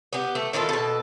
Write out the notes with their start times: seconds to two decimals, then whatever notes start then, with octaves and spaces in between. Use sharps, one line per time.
0.13 B3 G4
0.35 A3
0.53 D#3 E4 F4 A4
0.69 B2 A4